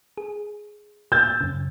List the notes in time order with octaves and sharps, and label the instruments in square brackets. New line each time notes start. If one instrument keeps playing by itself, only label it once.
[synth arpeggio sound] G#4
[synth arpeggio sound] E6 A6 [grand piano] G6
[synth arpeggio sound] F#2 C#3